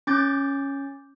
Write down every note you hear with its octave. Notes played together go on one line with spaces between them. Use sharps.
C#4 D6 G6 A6